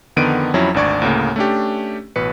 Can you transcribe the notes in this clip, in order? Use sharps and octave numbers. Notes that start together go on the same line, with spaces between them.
F2 D3 D#3 B3 D7 D#7
F2 F#3 C#4 E4
G#1 D2 D4 D5 C#6 G#6
D2 A2 C#3 A#3
A3 C#4 D4 G4
A1 B2 B4 C#7